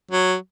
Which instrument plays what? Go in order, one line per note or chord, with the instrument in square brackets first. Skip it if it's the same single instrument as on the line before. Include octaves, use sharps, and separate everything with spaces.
[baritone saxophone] F#3